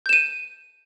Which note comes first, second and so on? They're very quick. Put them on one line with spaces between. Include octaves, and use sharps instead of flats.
G6 E7 D#7